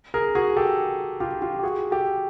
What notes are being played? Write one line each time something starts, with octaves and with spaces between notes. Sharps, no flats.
G#4 A#4
F#4 G#4
G4 A4
F4 G4
F4 G4
G4
F#4 G#4
G4 A4